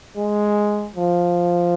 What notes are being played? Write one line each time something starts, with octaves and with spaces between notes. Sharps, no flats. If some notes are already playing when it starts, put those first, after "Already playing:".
G#3
F3